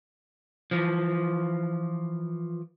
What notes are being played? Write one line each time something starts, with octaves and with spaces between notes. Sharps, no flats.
E3 F3